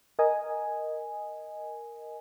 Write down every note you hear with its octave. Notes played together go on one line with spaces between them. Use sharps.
A#4 D#5 G#5